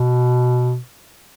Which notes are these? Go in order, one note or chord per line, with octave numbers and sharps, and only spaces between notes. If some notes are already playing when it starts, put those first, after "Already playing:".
Already playing: B2